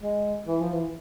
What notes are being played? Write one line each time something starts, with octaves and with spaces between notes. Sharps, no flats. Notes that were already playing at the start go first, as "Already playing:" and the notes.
G#3
E3
F3
E3